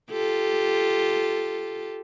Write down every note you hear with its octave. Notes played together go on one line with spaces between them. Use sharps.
F4 G4 A4